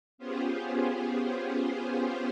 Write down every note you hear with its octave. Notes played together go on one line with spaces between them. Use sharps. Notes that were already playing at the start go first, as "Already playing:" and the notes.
B3 C#4 F4 G4 G#4 C5